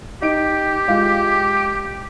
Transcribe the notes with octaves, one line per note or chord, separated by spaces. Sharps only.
D#4 G4 D7
G#3 F4 F5
D7